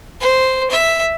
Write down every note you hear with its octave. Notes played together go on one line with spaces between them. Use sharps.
C5
E5